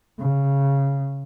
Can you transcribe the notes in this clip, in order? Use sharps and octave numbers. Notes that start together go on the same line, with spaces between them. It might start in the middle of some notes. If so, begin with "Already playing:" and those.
C#3